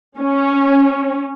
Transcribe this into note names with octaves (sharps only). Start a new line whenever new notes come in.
C#4